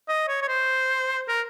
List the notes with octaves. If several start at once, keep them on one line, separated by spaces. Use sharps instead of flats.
D#5
C#5
C#5
C5
A#4